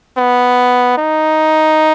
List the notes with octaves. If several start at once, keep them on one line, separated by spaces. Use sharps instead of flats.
B3
D#4